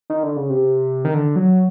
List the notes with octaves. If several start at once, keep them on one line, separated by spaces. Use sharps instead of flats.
D#3
D3
C#3
C3
D#3
D3
F#3